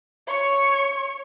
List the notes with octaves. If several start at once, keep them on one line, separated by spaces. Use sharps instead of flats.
C#5 C#6